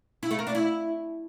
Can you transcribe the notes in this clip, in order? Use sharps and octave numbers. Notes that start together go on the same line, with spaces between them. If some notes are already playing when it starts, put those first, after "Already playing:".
E4
A3
A#4
D4
E4